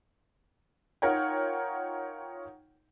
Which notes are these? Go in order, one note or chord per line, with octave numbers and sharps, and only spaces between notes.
D#4 F4 A#4 C#5 F#5 G5